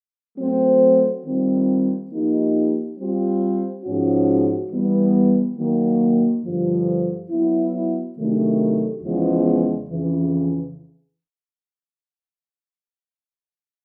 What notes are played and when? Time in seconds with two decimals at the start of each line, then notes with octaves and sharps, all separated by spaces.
0.37 F#3 A3 C4
1.24 D#3 G3 C4 F4
2.11 F3 A#3 D#4 G4
2.97 G3 C4 F4
3.84 G#2 F3 G#3 C#4 F#4
4.70 E3 G3 B3
5.57 D#3 F#3 A#3
6.43 G2 D3 F3
7.30 F#3 B3 E4
8.16 C3 D#3 F#3 A3 D4
9.03 E2 C#3 F3 G#3 B3
9.90 F2 C#3 E3